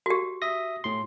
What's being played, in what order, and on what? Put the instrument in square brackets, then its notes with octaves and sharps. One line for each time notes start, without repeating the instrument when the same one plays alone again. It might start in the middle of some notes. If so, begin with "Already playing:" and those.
[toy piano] F#4 G4
[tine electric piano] E5 D#6 A#6
A2 C6